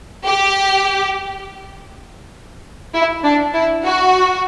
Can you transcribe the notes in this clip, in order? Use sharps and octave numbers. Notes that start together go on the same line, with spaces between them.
G4
E4
D4
E4
F#4